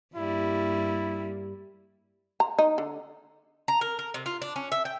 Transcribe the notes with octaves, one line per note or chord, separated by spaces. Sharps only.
G2 G3 A#3 E4
A#5
D#4
D3
A#5
A#4
A#4
C3
F4
D4
C#4
E5
G5